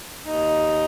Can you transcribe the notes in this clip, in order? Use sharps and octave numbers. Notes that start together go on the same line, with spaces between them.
D#2 D#4